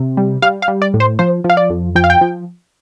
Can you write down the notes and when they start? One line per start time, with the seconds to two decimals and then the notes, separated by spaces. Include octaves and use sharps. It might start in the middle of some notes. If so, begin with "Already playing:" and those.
Already playing: C3
0.17 G3
0.42 G3 F5
0.62 F5
0.68 G3
0.82 D5
0.94 A2
1.00 C5
1.19 F3 C5
1.44 F3
1.50 F5
1.57 D5
1.70 F2
1.95 F3 G5
2.04 F5
2.10 G5
2.21 F3